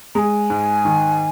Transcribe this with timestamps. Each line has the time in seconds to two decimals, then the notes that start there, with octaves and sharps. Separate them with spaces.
0.15 G#3 G#5 A#5
0.50 G#2
0.85 D#3